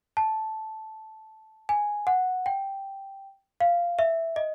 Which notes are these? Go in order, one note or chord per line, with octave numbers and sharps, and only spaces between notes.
A5
G#5
F#5
G5
F5
E5
D#5